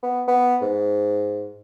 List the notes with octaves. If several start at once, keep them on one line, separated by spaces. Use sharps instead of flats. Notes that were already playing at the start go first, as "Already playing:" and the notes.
B3
B3
G#2